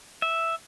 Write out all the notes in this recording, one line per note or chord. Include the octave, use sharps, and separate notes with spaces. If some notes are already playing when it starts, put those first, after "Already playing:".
E5